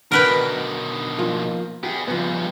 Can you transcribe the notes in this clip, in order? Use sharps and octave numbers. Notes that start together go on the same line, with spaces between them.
B2 D3 D#3 A#4 B4 G5
F3 A#3 F4
B3 G4 G#4
G2 C#3 F3 B3